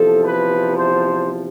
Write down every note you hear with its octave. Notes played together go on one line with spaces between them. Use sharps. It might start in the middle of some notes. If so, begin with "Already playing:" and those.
Already playing: E2 C3 F3 A4
B4
C5